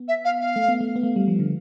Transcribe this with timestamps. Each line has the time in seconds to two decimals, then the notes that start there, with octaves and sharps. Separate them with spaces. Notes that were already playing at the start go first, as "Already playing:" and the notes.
Already playing: B3
0.08 E5
0.25 F5
0.40 F5
0.56 A3
0.68 B3
0.80 A3
0.96 B3
1.03 A3
1.16 G3
1.28 F3
1.39 D3